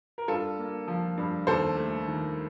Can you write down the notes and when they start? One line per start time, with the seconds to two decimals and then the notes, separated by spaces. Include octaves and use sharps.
0.18 A#4
0.28 G2 F4 A4
0.58 A#3
0.88 F3
1.17 G2
1.47 D#2 A4 C5
1.77 A3
2.08 D#3